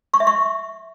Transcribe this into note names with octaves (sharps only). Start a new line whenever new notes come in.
C#6
E5
C#6